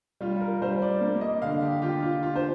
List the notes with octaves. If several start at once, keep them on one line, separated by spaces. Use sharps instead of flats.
G3 F4
A#4
G3 C5
D5
A#3
D#5
D3 F5
G4
F4 G4
F4
F4
C5